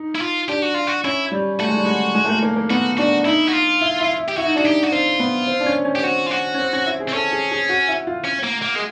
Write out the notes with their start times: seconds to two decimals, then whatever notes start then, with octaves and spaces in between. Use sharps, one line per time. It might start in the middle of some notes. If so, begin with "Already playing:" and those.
Already playing: D#4
0.15 E4
0.21 F4
0.48 D4 G4
0.62 F#4
0.74 F4
0.87 F#4
1.04 C#4 E4
1.32 G3
1.59 A3 F#4
1.68 G#3
1.76 G3
1.85 G#3
2.15 G#3
2.25 A3
2.28 A#3
2.43 A#3
2.56 A#3
2.70 B3 F#4
2.98 D4 F#4
3.26 D#4 E4
3.48 F#4
3.54 F4
3.81 E4
4.00 E4
4.18 E4
4.28 G4
4.37 E4 F#4
4.46 D#4
4.56 D4 F#4
4.64 D#4 G4
4.84 F#4
4.92 C4 F4
5.20 B3
5.48 C4
5.60 D4
5.66 C#4
5.85 C#4
5.96 G4
6.03 C4 F#4
6.26 F4
6.31 F#4
6.54 C#4
6.58 C4
6.73 C#4
6.86 E4
7.00 G#4
7.09 C4
7.14 C#4 A4
7.32 G#4
7.52 G#4
7.69 F#4
7.88 E4
8.07 F4
8.25 C#4
8.44 A#3
8.62 A#3
8.76 G#3